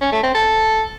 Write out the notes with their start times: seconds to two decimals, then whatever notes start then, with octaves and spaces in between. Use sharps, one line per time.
0.01 C#4
0.12 A3
0.23 C4
0.34 A4